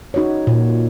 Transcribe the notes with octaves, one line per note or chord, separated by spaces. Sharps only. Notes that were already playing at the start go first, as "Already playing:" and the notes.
D#4 F#4 C#5
A#2